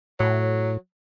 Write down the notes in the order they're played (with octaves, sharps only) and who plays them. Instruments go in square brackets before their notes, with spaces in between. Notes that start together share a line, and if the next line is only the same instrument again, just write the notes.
[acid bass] A2 [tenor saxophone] F#3